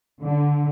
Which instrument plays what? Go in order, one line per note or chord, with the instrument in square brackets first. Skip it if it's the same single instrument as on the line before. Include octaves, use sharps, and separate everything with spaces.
[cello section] D3